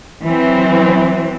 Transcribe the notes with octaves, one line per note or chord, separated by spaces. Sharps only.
E3 F#3 C4